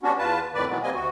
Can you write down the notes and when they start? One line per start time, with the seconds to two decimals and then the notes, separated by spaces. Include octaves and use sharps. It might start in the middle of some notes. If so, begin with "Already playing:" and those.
0.03 G3 B3 C#4 D4 F#4
0.18 E2 F4 B4 A5
0.54 F2 A2 D3 D#3 B4 D5
0.69 B2 D#3 E3 F#3 G#3 B3
0.83 C3 G3 A#3 C4 D#5 G#5
0.94 D2 F#4